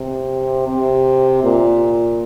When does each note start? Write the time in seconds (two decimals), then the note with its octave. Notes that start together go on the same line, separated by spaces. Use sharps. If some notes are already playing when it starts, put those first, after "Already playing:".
Already playing: C3
0.68 C3
1.43 A#2